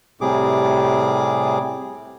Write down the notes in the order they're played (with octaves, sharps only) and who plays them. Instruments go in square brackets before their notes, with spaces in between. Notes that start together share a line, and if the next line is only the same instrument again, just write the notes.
[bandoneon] A2 C3 G3 G#4 D6